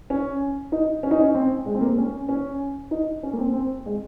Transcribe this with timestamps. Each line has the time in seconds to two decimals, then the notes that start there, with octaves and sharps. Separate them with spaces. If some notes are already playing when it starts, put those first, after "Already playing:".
0.10 C#4
0.72 D#4
1.03 C#4
1.11 D#4
1.20 C#4
1.35 C4
1.66 G#3
1.75 C4
1.81 A#3
1.98 C#4
2.29 C#4
2.91 D#4
3.23 C#4
3.33 A#3
3.38 C4
3.54 C4
3.86 G#3